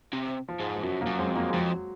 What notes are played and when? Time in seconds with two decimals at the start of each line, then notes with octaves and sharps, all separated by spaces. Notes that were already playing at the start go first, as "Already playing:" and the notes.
0.13 C3
0.49 F3
0.60 G#2
0.76 F3
0.83 F#2 F#3
1.01 F#3 A#3
1.07 F#2
1.18 G#3 C4
1.30 F2
1.36 F#3 A#3
1.49 G#3
1.54 F2 F#3